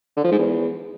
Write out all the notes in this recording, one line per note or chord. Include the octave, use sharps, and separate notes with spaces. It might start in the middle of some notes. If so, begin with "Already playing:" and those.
D3
F3
G#2
E2